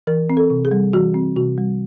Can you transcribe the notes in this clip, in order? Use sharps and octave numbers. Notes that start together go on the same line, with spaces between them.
E3 A#4
C4
A4
C3
G#4
G3
E3 F#4
C4
C3 F#4
G3